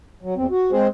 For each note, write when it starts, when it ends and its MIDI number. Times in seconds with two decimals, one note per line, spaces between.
0.23 0.34 54
0.37 0.47 40
0.37 0.47 60
0.50 0.71 66
0.72 0.88 56
0.72 0.88 60
0.72 0.88 68
0.72 0.88 72